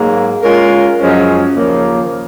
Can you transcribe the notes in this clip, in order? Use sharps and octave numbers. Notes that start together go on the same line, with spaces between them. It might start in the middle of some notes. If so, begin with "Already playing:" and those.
Already playing: G#2 F#3 A#3
G#3 C#4 F4 A#4
F#2 F3 G#3 C#4
D#2 C#3 F3 A#3